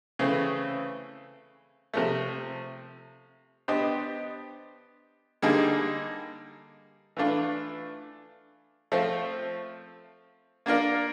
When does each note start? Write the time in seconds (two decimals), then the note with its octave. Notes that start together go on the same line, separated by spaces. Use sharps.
0.19 C#3 E3 A3 C4
1.93 C3 F3 A3
3.68 B3 D4 G4 C5 D#5
5.42 D3 G3 A#3 D#4 G#4
7.17 E3 A3 D4 F4
8.92 F3 A3 C4 F4
10.66 A#3 D4 F4 A#4 D5